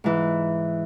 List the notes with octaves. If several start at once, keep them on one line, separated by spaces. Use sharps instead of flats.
G#2 E3